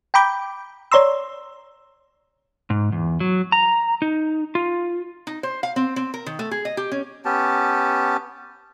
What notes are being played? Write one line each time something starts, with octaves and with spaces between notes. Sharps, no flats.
G5 A#5 B5 D6 G6
C#5 D5 A#5 C6 E6
G#2
E2
F#3
A#5
D#4
F4
D#4
C5
F5
C4
C4
A#4
D#3
A3
G#4
D#5
G4
C#4
B3 C#4 G4 A5